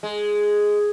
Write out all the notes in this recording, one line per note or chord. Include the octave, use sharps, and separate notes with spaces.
G#3